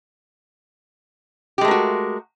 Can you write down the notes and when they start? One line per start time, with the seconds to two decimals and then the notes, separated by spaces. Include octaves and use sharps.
1.58 G4
1.61 G#3
1.65 A3
1.68 A#4
1.71 F#4